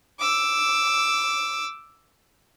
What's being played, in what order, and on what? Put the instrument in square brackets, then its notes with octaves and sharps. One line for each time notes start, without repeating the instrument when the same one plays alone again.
[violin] D6 E6